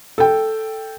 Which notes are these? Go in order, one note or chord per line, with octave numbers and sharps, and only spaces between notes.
A4 G5